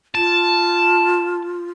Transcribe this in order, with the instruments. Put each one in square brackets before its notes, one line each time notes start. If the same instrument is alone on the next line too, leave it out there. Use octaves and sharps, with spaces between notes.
[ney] F4 [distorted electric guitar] A5